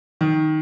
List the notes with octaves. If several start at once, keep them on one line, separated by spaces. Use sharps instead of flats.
D#3